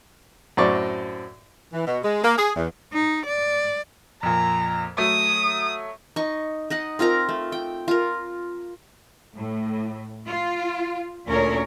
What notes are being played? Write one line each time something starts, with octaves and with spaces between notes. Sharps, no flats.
F#2 A2 C4 D5 C#6
E3
B2
G#3
A#3
G#4
E2
D#4
D5
F2 A#2 A#5
F#3 A3 D#6
D#4 C#6
D#4 D#5 F#5
C4 F4 A#4 A#5
A3
G5
F4 A#4
A2
F4
D2 A#2 C#4 A#4 C#5